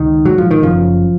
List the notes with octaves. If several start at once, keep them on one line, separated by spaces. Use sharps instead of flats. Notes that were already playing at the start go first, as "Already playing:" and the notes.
Already playing: C#2 D#3
A#1 G#2 F#3
F3
D#3
F#1 F#2 C#3 F3